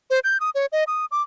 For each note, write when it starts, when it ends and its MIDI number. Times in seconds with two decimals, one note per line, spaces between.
0.10 0.19 72
0.24 0.40 91
0.40 0.50 87
0.55 0.66 73
0.72 0.84 75
0.87 1.06 87
1.11 1.22 86